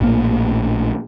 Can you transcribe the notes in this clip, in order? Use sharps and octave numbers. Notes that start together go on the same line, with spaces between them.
A#1 A2 C3 A#3